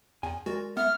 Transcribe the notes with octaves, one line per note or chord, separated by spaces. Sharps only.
E2 G#5
G#3 F#4 A#4 D5
B3 E5 F6